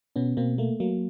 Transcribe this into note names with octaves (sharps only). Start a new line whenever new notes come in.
B2 B3 C#4
B2 A#3 C4
A3 A#3
F#3 A#3